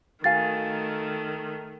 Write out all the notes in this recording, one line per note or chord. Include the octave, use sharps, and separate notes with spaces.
D#3 A3 F#4 F5 G#5 A6